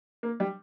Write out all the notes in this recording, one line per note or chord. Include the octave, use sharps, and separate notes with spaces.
A#3
G3